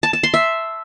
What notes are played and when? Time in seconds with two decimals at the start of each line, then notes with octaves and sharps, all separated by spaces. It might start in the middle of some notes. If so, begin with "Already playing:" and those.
0.03 A5
0.13 A5
0.23 C6
0.34 E5